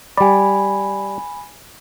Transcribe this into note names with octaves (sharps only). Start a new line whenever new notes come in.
G3 D5 G#5 B5